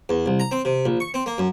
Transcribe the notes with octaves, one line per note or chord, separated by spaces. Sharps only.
E2
C2
A#5
C4
C3
A#1
C#6
C4
A#3
F#2